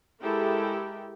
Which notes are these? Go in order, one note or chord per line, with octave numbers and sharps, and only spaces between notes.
G#3 E4 G4 A4 A#4 G5